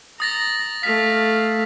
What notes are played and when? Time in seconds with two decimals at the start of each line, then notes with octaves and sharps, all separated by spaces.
0.20 A#5 D#6 A6 A#6
0.83 A3 F5 B6